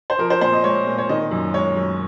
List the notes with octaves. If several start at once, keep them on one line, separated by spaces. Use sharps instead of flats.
C5
F3 A#4
C5
A#2 C5
D#5
G#3 C#5
A#2
C#5
D#3 D#5
F#2
G#3 C#5
F#2